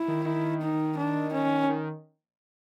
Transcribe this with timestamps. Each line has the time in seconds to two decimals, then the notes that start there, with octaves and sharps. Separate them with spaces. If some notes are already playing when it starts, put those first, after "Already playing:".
Already playing: E4
0.08 D#3
0.25 D#3
0.61 D#4
0.97 D4
1.33 C#4
1.69 D#3